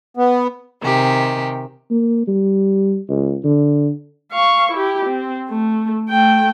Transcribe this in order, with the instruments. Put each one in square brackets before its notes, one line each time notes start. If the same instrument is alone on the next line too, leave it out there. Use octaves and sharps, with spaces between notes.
[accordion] B3
[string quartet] C3 D#3 G#3 G4
[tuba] A#3
G3
C#2
D3
[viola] F5 C#6
E4 G4
C4
A3
A3 G5